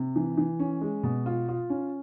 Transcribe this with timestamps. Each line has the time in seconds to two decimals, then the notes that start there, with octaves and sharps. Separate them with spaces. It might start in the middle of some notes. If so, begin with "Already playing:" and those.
Already playing: C3
0.16 E3
0.37 E3
0.59 C#4
0.81 G#3
1.03 B2
1.26 F4
1.49 F4
1.70 C#4